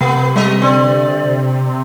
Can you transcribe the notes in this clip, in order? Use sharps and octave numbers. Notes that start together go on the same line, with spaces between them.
C3 A3 B3
G3 G#3 D#5
D3 C4 C5 D5 C6